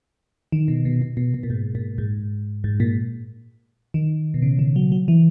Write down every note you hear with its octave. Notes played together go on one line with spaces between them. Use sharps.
D#3
B2
B2
B2
B2
B2
A#2
G#2
A#2
G#2
G#2
A#2
D#3
B2
C#3
D#3
F#3
F#3
E3